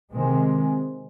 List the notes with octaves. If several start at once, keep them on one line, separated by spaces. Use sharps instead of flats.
C3 D#3 G#3 C4